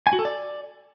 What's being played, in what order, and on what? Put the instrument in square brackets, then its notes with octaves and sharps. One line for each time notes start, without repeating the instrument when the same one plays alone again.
[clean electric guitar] G#5
F#4
A4
D5